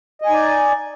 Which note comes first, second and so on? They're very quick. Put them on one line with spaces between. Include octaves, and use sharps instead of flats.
D#5 G#5 D#4 D5